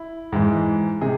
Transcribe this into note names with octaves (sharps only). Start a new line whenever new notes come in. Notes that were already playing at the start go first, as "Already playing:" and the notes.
Already playing: E4
G#2 E3
C3 G#4